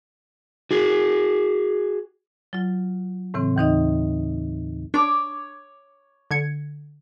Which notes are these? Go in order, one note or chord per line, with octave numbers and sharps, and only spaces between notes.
F#4 G#4
F#3 F4
A2 C#3 E3 C4
D#2 E3 D#4 D#5
D4 C#5 D6
D3 G#6 C#7